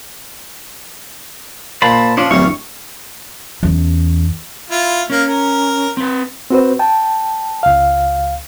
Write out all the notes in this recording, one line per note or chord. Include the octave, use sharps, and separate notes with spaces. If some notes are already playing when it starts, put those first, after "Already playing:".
A#2 C5 A5 B5
F3 C#4 D4 F4
D1 E2 G2 G3 F5 C#6
E2 C#4
E4 F4
A#3 C#4
A#4
C4 B4
C4 F#4 B4 C5
G5 A5
C#2 F5